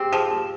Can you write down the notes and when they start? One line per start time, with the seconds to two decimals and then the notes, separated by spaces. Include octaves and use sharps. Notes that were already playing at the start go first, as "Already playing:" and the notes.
Already playing: C4 G4 G#4
0.12 F3 G#4
0.31 G4